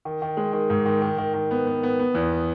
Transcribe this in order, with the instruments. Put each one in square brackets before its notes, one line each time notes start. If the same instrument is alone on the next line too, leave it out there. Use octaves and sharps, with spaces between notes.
[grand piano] D#3
D#3
G#3
D#3
G#2
D#3
D#3
D#3
D#3
B3
B3
B3
B3
E2